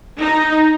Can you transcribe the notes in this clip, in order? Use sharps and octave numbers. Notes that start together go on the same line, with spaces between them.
D#4